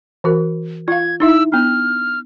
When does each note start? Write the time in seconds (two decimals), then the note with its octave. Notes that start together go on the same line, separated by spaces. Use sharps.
0.24 E3 F#4 A#4
0.88 F4 F5 G#6
1.20 D#4 E4 E5 E6
1.52 B3 D4 F6